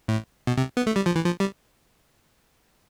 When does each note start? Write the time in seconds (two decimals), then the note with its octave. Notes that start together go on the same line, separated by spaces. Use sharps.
0.08 A2
0.47 B2
0.58 C3
0.77 B3
0.87 A3
0.96 G3
1.06 F3
1.15 E3
1.25 F3
1.40 G3